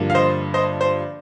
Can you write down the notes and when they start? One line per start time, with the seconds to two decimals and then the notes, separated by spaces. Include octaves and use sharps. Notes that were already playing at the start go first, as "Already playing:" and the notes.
Already playing: G2 D3 F3 A#3
0.10 F5
0.15 C5 D#5
0.54 C5 D#5
0.81 C5